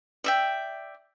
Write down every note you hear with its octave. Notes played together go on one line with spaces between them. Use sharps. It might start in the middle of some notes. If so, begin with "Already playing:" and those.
D5 E5 G5